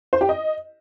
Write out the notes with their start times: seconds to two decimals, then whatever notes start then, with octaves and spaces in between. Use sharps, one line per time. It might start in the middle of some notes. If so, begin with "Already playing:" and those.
0.13 C5
0.21 G4
0.29 D#5